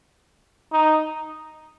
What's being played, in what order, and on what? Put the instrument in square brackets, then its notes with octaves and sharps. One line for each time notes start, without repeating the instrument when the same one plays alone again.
[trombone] D#4